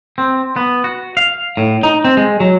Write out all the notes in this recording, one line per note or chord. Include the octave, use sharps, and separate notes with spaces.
C4
B3
F#4
F5
A2
D#4
C4
G#3
F#3